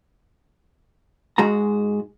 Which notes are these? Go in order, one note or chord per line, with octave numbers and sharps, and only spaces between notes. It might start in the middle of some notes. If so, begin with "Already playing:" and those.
G#2 G#3 F#4 A#5